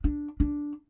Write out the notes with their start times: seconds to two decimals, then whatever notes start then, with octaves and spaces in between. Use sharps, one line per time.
0.04 D4
0.40 D4